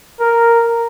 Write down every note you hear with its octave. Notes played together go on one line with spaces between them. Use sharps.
A#4